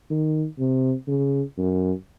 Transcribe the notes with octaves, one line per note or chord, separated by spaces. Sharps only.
D#3
C3
C#3
F#2